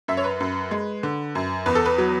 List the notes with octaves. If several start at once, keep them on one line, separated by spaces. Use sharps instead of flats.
F#2 E5
C#5
B4
F#2
G#3
D3
F#2
E2 B4
A4
B4
F#3